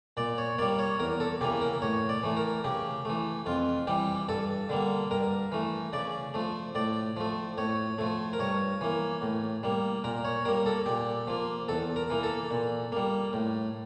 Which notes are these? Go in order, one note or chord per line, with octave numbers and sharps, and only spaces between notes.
A#2 D5
C#5
G3 A#3 D5
C#5
E2 A#4
A4
C#3 E3 A#3 G4
A#4
A2 C#5
D5
E3 A3
A#4
C#3 G4
E3 A3
F2 F4
E3 G3 G4
G2 A4
D3 G3 A#3
G2 A#4
E3 A3
C#3 D5
F3 A3
A2 D5
F3 A3
A2 C#5
F3 A3
A#4
G2 C#5
E3 A#3
A2
G3 A#3
A#2 A#4
C#5
G3 A#3 A#4
A4
A#2 G4
F3 A#3
E2 A4
A#4
E3 A#3
A4
A#2
G3 A#3
A2